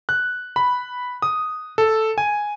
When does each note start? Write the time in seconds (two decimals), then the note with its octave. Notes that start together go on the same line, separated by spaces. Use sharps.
0.09 F#6
0.56 B5
1.22 D#6
1.78 A4
2.18 G#5